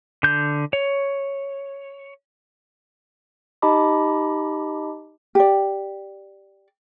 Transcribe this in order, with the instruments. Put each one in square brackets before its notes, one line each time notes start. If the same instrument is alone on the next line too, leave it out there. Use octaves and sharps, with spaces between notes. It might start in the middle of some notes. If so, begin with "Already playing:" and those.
[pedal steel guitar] D3 G6
C#5
[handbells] D#4 G4 D#5 A5 B5 D6
[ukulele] G4 D5